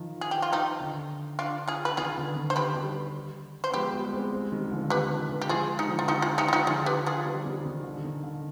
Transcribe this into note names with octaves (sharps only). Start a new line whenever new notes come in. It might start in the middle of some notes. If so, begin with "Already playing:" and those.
Already playing: D#3 F3
G#4
G4
F4
D#4 G4
D3
D4 F4
F4 G#4
B4
D#3 F4 G#4
D3
D#3
C5
G4 B4
D#3 G3
C5
B3
F3 G#3 G4 B4
G3 B3
G#3 C4
G#3 C4
D#3 G3
D3 F3
D#3 G4 B4
D#3
D3
G4
F3 G#3 F4 G#4
D#4 G4
D3 F3
F4
D#3 D#4 G4
F4 G#4
D#4 G4
F4
D#4 G4
D3 F3 F4 G#4
G4 B4
F4 G#4
D#3 G3
D#3 G3
D#3
D3
D#3
D3